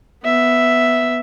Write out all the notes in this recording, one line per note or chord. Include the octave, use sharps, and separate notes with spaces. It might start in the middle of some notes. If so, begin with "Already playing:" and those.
B3 E5